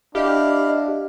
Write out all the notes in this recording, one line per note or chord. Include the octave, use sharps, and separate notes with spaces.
D4 E4 G4 D#5 F5